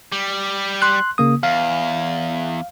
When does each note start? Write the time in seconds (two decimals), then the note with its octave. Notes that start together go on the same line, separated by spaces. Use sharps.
0.12 G3
0.82 C6 F#6
1.18 C#3 A#3 D#6
1.43 E2 F5